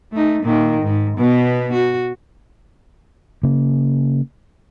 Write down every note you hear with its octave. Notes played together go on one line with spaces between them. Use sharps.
A3 D#4
A#2 D#3
G#2
B2 B3
F#4
C#3 A#3